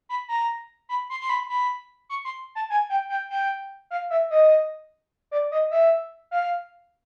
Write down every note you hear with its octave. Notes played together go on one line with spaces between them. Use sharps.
B5
A#5
B5
C6
C6
B5
B5
C#6
C6
A5
G#5
G5
G5
G5
F5
E5
D#5
D5
D#5
E5
F5